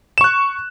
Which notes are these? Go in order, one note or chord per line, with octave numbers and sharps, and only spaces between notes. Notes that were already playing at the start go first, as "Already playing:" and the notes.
C#6 F#6 E7